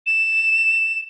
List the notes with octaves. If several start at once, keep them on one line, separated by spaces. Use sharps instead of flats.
E7